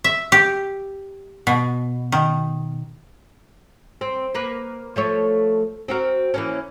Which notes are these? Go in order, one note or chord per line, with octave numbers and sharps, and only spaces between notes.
E5
G4
B2
D#3
C4
A#3 A#4 B4
F3 A3 C#5
C4 F#4 A#4
E3 A#3 C#4